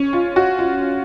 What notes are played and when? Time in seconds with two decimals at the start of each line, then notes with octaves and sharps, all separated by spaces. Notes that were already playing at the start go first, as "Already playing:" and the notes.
Already playing: C#4
0.13 F4
0.36 F#4
0.59 F4